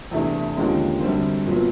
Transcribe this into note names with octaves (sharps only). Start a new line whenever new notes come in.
E2 C3 E3 A3 D4
D#2 D3 F3 G#3 C#4
F#2 D3 G3 C4
A#2 F#3 B3